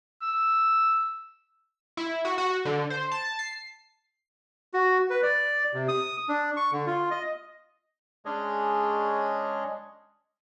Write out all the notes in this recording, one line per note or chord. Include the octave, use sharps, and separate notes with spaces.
E6
E4
F#4
F#4
D3
C5
A5
C7
F#4
B4
D5
C3
D#6
D4
C#6
D3
F4
D#5
G#3 C#4 D4 G#4 C#5 D#5